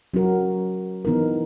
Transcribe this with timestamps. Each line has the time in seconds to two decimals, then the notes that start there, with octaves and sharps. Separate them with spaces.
0.14 F#3 C#4 F#4 A#4
1.05 E3 B3 D#4 A#4